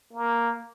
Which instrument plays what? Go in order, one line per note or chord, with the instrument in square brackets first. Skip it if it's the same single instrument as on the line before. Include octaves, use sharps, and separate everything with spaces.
[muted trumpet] A#3